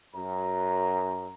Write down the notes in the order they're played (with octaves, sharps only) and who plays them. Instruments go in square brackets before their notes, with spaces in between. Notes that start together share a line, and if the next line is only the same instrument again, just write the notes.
[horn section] F#2 [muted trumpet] A#5